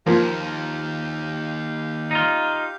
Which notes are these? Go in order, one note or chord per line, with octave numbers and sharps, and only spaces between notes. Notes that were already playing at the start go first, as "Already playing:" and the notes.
D#2 F3 A#3 G4 F5
D#4 F4